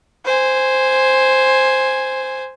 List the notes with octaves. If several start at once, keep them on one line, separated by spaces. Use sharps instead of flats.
C5 G#5